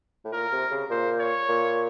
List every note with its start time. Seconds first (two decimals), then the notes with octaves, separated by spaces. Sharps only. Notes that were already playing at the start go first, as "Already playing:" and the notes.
0.25 A2
0.32 A#2 A#4
0.52 C3
0.71 C#3
0.90 A#2 C5
1.20 C#5
1.49 A#2